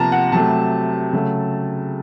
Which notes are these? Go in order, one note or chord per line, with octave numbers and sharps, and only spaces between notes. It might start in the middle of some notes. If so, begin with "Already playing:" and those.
Already playing: C3 F3 A#3 A5 A#5
F#5
C3 F#3 A3 A5
C#3 F#3 A3